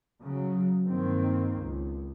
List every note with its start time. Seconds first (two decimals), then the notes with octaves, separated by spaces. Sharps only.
0.23 C#3 F#3
0.88 G2 D#3 A#3 C4
1.57 C#2